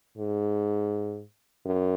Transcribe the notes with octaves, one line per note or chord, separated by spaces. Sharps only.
G#2
F#2